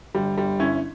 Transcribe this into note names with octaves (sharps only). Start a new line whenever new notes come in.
G1 G3
G1 G3
G1 C#4 E4